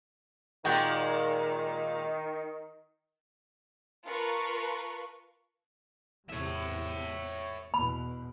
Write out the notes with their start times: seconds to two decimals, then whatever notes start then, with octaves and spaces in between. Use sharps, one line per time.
0.65 A#2 D#3 G#3 F#4 G5
4.06 F4 A#4 B4 F5 A5 C#6
6.30 E2 A2 C3 C#5 E5
7.74 E2 B2 B5